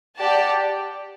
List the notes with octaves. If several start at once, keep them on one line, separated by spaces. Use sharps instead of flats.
G4 D5 F#5 A5